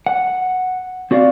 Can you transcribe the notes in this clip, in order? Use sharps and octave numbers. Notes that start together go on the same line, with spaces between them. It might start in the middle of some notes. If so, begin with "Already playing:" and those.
F#5
C4 F#4 D5 D#5 F5